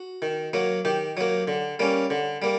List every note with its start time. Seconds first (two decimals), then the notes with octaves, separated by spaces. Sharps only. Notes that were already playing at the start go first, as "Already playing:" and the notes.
Already playing: F#4
0.22 D#3
0.53 F#3 A#3
0.85 D#3 G4
1.17 F#3 A#3
1.48 D3
1.79 G3 A#3 C#4
2.10 D3
2.42 G3 A#3